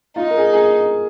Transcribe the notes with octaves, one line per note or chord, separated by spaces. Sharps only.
D#4 F4
A#4
G#4
G#4